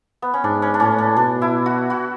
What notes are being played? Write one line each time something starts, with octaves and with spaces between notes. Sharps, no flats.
B3
C#4
G#2 D4
C#4
D4
A2 C#4
D4
B2 D4
E4
F#4
F#4